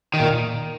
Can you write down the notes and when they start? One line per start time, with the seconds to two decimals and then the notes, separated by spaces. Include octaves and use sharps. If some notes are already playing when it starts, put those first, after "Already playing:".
0.14 D#3
0.20 A#2